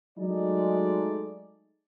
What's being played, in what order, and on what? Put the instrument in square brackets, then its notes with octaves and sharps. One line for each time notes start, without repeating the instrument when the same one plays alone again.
[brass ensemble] F#3 G#3 A3 D#4 D5